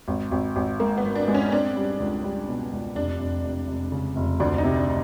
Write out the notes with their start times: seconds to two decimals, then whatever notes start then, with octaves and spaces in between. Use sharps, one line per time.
0.08 G#1
0.31 G#1
0.56 G#1
0.80 G#2 A#3
0.98 B3
1.04 G#2
1.15 D4
1.28 G#3
1.34 C#4
1.52 C4 D4
1.76 G3
2.00 C#2
2.24 G3
2.48 B2
2.71 C#2
2.95 F1 D4
3.20 F1
3.44 F1
3.68 F1
3.92 C#3
4.16 F1
4.40 D2 D4
4.54 D4
4.58 D#4
4.64 C3
4.76 D4